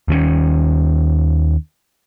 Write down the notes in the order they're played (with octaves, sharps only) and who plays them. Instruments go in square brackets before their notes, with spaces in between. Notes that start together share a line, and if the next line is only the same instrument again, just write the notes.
[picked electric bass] D#2 D#3 F#3 C#4